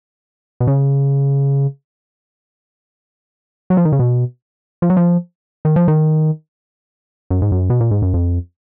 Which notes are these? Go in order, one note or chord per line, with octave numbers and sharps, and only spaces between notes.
B2
C#3
F#3
F3
D#3
C#3
B2
F3
F#3
F3
D#3
F3
D#3
F#2
G#2
F#2
B2
A#2
G#2
F#2
F2